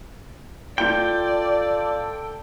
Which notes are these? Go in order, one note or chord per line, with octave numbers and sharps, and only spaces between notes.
F4 A4 D5 G5 G6